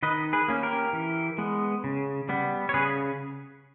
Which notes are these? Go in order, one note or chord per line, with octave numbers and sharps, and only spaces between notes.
D#3 B4 D#5
G#4 B4
A#3 C#4
G4 A#4
E3
G#3 B3
C#3
G3 B3
C#5
C#3 G#4 B4